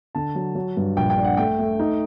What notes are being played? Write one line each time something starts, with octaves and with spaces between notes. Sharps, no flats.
D3 A5
F#3
F#3
G2
A#1 G5
G5
D4
F#5
A3 G5
A3
D#4